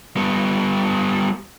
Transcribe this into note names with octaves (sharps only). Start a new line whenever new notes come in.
G3 B3